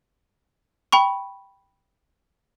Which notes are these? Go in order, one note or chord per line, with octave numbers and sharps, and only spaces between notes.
G5 B5 C#6